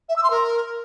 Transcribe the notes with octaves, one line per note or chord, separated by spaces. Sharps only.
E5
E6
C6
A#4